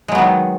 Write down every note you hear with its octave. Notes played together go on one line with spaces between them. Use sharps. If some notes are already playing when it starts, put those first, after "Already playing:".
D#3 F#3 G#3 B3